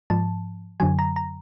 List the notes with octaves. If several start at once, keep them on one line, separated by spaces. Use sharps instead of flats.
G#2 F3 A5
F#2 D3 F#3 G#5
A#5
A#5